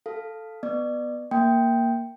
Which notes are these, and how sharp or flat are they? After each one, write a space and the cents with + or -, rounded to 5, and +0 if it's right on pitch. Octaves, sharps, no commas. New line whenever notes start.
A4 +0 F5 +0
B3 -5 D5 +35
A#3 +0 G5 +0